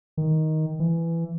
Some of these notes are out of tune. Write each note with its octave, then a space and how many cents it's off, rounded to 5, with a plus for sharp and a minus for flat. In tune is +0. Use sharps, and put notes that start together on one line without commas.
D#3 +10
E3 +15